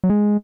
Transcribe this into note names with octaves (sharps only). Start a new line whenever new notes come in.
F#3
G#3